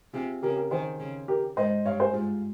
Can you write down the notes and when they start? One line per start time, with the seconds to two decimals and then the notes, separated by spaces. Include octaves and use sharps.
0.14 C3 F4 G#4
0.42 C#3 G4 A#4
0.56 G4 A#4
0.71 D#3 G#4 C5
1.00 C#3
1.28 G4 A#4
1.57 G#2 C5 D#5
1.85 G2 C#5 F5
2.00 G#4 C5
2.14 G#2 F4 G#4